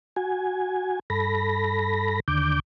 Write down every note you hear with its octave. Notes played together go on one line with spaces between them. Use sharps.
F#4 G#5
G2 A4 B5 A#6
D#2 D3 D6 G6